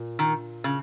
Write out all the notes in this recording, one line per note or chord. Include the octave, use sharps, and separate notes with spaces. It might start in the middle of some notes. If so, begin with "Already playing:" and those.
Already playing: A#2
D#3
C#3